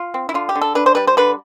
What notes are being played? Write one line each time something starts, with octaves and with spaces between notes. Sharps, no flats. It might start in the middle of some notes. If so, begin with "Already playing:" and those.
Already playing: F4
C4
E4
D3 F4
G4
D3
A4
D4 B4
C5
G3 B4
C5
D3 B4